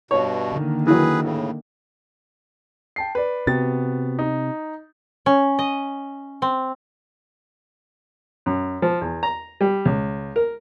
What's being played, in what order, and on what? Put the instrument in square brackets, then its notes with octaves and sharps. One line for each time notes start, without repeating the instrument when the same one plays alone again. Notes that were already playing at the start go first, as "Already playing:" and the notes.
[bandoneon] G2 B2 [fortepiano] C#5
[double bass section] D3 D#3 A#3
[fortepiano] E3 F#3 [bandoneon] G#4 B4
[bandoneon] A2 C#3
[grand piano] G5 A5 C7
B4 D5
[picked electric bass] C3 [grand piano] B3 F#4 A6
[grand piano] D#4
[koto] C#4
D#5
C4
[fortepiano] F#2
F3
E2
A#5
G3
C#2
A#4